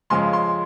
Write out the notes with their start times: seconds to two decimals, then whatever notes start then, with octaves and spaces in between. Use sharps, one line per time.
0.10 F2 C#3 F3 G#3 C6
0.33 C6